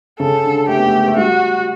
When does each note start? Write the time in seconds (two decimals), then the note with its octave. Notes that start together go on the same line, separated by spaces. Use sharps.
0.19 C#3 A4
0.44 D3
0.68 A3 G4
0.77 B3
0.86 A3
1.08 A3
1.17 G3 F#4